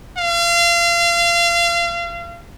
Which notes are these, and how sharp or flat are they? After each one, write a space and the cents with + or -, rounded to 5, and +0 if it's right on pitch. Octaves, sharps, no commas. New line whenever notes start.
F5 -30